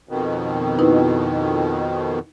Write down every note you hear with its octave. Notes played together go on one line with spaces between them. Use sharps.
F2 B2 D#3
D#4 E4 B4